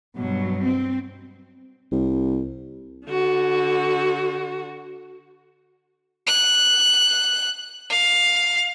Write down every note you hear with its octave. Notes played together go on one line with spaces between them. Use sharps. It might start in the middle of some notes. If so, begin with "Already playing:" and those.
G2 B2 F#3
C4
C2
D3 F#4
F#6
F5